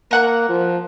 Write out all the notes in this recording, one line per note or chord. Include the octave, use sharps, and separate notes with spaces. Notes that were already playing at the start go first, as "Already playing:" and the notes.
A#3 A#4 F#5 A#5
F3